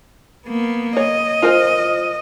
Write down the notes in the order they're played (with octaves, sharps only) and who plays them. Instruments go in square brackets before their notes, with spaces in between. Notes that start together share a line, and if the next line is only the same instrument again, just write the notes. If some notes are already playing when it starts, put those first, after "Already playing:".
[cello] A#3 B3
[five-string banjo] C#5 [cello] D#5
[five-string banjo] F4 A#4 C5